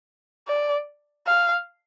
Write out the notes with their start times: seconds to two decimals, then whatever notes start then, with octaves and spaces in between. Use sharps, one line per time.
0.48 D5
1.28 F5